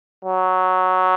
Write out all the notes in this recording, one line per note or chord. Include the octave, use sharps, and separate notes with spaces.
F#3